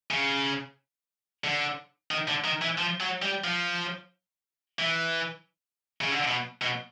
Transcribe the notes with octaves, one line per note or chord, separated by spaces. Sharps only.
C#3
D3
D#3
D3
D#3
E3
F3
F#3
G3
F3
E3
C#3
D3
B2
B2